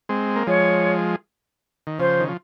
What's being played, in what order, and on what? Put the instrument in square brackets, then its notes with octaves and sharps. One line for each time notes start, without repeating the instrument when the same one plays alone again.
[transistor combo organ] G#3 C4
A#3
[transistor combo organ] F3 G#3 [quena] C#5
[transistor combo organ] D#3
[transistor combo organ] C#3 F3 [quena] C5
[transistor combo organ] D#3
F3